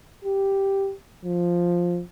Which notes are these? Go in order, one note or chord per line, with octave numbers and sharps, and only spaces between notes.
G4
F3